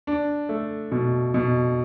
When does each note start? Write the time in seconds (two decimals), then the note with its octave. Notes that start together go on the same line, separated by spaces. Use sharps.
0.07 D4
0.49 A3
0.92 B2
1.34 B2